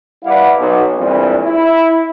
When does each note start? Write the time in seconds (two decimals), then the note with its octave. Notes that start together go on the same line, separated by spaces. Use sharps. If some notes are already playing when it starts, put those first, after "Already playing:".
0.24 G3 E4 B4 D5 F5 F#5
0.58 B1
0.97 G2 A#2 E3 G#3 C4 F4
1.46 E4